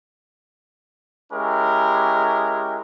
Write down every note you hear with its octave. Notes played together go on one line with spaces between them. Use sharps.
G#3 C#4 E4 G4 A#4